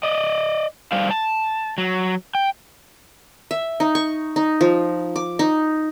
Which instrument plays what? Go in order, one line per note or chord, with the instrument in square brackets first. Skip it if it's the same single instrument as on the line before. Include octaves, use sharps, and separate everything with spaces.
[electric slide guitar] D5 D#5
G3 C5 D5 F5
A5
F#3
G5
[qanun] E5
D#4
C#6
D#4
F3
D6
D#4